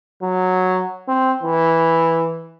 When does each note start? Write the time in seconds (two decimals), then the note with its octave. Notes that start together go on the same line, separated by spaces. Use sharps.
0.22 F#3
1.08 C4
1.43 E3